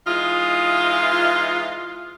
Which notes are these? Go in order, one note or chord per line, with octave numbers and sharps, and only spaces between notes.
E3 G#3 D#4 F4